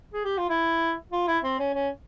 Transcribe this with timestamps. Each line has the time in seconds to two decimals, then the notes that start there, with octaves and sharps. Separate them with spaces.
0.13 G#4
0.24 G4
0.37 F4
0.49 E4
1.12 F4
1.28 E4
1.43 C4
1.59 C#4
1.74 C#4